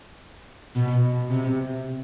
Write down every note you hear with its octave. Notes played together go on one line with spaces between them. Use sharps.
B2
C3